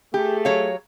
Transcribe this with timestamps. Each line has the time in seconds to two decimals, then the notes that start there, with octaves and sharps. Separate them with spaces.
0.14 A3 G4 G#4
0.45 F#3 C#5 F5